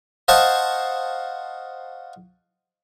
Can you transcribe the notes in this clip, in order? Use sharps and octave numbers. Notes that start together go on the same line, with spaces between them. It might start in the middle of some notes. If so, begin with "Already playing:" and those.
C5 D#5 F5 F#5 A5 C#6